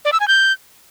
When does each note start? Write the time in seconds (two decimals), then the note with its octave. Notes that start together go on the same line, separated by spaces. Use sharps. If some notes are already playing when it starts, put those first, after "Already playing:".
0.05 D5
0.13 E6
0.20 G#5
0.28 G6